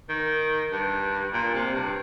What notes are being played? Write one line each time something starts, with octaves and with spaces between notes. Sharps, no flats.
D#3
G2
A#2
C3
G2